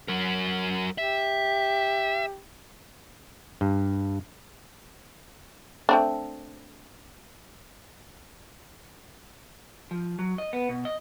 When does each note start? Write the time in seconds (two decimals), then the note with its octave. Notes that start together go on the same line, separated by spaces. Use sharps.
0.08 F#3 A#4
0.98 G4 E5
3.61 G2
5.89 A3 C4 D4
9.91 F3
10.19 F#3
10.38 D#5
10.53 B3
10.69 B2
10.85 D#5